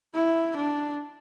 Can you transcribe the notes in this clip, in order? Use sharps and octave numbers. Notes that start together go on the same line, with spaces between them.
E4
D4